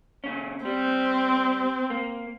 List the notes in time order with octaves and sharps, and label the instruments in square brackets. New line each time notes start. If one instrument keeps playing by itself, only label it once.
[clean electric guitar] A#2 C#3 C#4
[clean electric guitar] G3 [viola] C4
[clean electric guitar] A#3